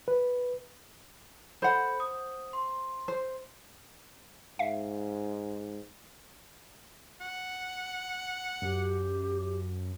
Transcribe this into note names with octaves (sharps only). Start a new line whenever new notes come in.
B4
A4 C5 F#5 B5 G6
D#6
C6
C5
G#2 E5 F5
F#5
F#2 G4